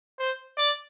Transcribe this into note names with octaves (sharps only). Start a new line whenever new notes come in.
C5
D5